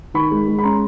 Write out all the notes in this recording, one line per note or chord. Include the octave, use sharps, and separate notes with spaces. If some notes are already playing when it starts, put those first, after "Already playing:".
D#3 B5 C#6
G#3
G#3
B5
C#4 A#5 C6